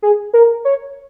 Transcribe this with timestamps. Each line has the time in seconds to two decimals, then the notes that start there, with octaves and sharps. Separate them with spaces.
0.02 G#4
0.34 A#4
0.65 C#5